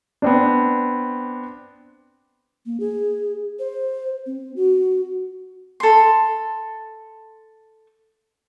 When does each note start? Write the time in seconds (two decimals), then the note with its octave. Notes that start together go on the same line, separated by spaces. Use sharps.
0.22 B3 C4 D4
2.66 A#3
2.80 G#4
3.59 C5
4.26 C4
4.56 F#4
5.80 A4 C6